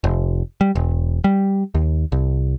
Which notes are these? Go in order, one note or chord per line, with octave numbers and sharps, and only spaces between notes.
F1
G3
E1
G3
D#2
C2